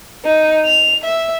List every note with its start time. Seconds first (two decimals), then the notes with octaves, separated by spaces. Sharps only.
0.25 D#4
0.65 F7
1.04 E5